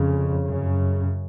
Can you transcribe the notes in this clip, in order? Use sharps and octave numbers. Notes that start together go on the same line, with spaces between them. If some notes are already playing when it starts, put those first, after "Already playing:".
Already playing: F2 C#3
F#2 C#3